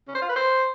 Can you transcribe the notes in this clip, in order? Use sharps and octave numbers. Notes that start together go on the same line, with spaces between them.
C#4
C5
F4
B4
C5